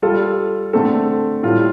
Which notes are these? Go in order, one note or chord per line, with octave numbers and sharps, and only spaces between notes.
G3 F4 A4
D3 A3 C4 A4
A2 G3 F4